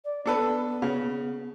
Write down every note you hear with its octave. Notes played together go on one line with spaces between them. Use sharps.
D5
B3 D4 A4 B4
C#3